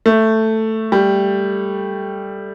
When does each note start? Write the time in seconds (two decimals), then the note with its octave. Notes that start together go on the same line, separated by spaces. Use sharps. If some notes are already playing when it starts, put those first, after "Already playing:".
0.06 A3
0.92 G3